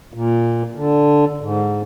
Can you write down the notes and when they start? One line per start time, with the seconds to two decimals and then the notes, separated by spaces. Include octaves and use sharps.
0.14 A#2
0.75 D3
1.41 G#2